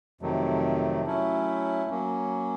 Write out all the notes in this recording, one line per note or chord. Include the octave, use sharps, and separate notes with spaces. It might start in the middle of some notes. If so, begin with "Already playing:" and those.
F2 C3 D#3 F#3 A3
F#3 A3 C#4 E4
F#3 A#3 C#4